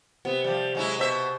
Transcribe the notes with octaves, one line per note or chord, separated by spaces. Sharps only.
C3 B3
F3 G3
F#3 G#3 E4
B2 C5 E5